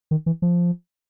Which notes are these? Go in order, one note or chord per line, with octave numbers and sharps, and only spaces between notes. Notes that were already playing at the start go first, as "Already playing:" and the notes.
D#3
E3
F3